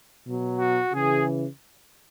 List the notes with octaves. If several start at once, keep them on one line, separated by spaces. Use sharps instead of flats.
B2 F#3
F#4
C#3 E3 G#4